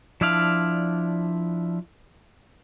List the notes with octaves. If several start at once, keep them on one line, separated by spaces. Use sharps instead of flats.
F3 D4 E4 D5 F5